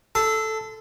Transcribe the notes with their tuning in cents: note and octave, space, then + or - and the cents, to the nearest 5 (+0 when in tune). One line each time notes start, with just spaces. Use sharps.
A4 +0 A5 +0 C6 -35